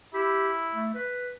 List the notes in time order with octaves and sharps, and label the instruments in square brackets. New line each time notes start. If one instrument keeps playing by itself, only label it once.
[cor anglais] E4 [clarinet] G4
[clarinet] A3
B4